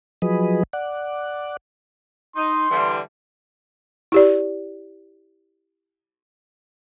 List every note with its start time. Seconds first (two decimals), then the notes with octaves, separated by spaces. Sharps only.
0.22 F3 F#3 G#4 B4 D#5
0.73 D5 F#5
2.36 D#4 C6
2.70 D3 E3 G3
4.12 E4 G4 D5